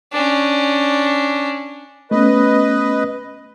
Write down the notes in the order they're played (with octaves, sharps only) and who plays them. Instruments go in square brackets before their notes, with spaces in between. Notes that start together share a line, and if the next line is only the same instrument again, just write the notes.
[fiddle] C#4 D4
[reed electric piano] A3 B3 C#4 [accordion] B4 D#5